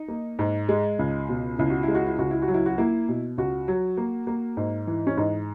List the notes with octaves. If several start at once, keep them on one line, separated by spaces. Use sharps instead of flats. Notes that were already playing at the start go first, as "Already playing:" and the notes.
Already playing: D#4
A#3
G#2
G#3
C#2
B2
C#2 E4
F#4
E4
G#3
F#4
E4
C#2 F#4
E4
F#4
F#3
E4
F#4
A#3 E4
B2
C#2 F#4
F#3
A#3
A#3
G#2
E3
C#4
G#2 D#4